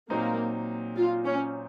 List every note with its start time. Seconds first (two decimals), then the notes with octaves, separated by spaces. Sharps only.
0.10 A#2 F#3 A#3 C4 D#4
0.97 F4
1.26 C#4